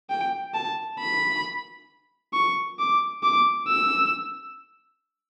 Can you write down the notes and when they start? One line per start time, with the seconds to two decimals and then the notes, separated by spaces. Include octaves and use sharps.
0.10 G5
0.54 A5
1.00 B5
2.33 C#6
2.79 D6
3.23 D6
3.68 E6